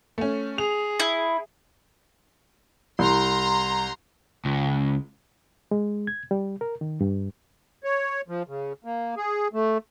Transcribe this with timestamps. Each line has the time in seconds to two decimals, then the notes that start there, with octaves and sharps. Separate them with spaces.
0.18 A3 C#4
0.58 G#4 F7
1.00 E4
2.99 C2 A#5 C6
4.45 C#2
5.71 G#3
6.07 G#6
6.31 G3
6.61 A#4
6.81 D#3
7.01 G2
7.84 C#5
8.28 F3
8.48 C#3
8.84 A#3
9.17 G#4
9.53 A3